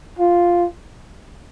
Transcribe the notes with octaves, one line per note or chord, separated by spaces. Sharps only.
F4